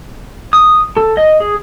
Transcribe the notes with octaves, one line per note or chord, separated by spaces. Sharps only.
D#6
A4
D#5
G#4